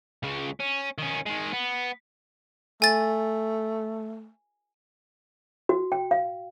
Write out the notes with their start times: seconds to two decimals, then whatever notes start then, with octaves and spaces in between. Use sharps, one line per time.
0.23 C#2 C#3
0.60 C#4
0.98 D#3 C#4
1.26 D#3 G#3
1.53 B3
2.82 A3 G#5 A6
5.69 F#4
5.92 G5
6.11 F5